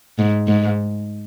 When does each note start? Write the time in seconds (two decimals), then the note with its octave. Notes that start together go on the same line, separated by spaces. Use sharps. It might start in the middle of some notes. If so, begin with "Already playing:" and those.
0.19 G#2
0.48 G#2